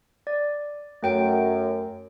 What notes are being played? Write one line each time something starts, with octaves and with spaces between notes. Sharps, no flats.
D5
F#2 A3 G5 D7